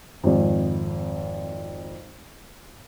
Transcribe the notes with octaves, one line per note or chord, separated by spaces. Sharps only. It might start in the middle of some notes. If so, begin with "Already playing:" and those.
G#1 F2